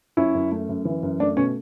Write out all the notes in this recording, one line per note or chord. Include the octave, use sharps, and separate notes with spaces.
F#2 C#4 E4
F#2
A3
F#2
E3
F#2
A3 D4
B2 C#4